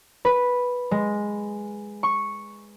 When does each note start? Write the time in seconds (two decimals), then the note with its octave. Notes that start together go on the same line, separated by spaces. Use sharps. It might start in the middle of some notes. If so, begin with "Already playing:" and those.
0.25 B4
0.91 G#3
2.03 C#6